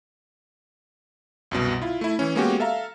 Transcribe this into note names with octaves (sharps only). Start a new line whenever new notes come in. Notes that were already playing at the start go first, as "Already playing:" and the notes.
C2 F#2 B2
E4 F4
A3 E4
E3 C#4
G#3 A#3 B3 C#4 F#4 G4
A4 E5 F5 A#5